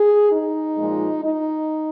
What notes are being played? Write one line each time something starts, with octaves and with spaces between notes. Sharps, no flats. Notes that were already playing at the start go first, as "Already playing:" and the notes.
Already playing: G#4
D#4
A#2 F3 G#3
D#4